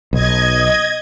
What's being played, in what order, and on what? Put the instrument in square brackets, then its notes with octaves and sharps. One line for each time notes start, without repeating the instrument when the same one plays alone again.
[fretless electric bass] B1 [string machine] D#5 G#6